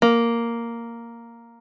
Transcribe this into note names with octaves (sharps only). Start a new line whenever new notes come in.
A#3